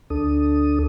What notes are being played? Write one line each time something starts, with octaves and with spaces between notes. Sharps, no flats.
D2 D4 A4 D#6